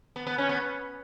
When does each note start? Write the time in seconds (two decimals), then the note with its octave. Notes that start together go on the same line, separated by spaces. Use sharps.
0.16 B3
0.27 B3
0.38 C#4
0.49 B3